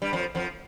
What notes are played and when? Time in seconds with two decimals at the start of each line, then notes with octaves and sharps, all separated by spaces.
0.02 G2 G3
0.13 F2 F3
0.35 F2 F3